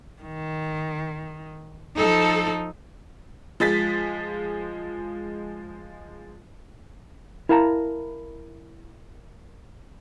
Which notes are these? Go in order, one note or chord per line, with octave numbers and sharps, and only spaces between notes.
D#3
F3 D#4 A4
F3 G#3 A6 B6
E4 A#4 F5 A5 A#5